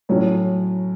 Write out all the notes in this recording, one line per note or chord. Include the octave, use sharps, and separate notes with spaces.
A2 F#3 C#4